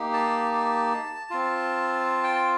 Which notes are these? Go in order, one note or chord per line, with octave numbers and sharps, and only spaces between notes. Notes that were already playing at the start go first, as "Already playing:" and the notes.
Already playing: A#3 D#4 G4
A5
C4 F4
G5